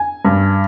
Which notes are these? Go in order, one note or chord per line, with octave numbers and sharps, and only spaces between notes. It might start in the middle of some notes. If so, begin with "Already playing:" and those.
Already playing: G#5
G2